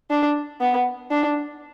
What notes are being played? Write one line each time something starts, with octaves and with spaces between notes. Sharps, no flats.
D4
B3
D4